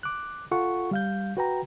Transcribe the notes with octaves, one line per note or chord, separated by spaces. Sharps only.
D6 F#6
F4 A4 F#5 C#6
G3 F5 G6
F#4 B4 G5 A#5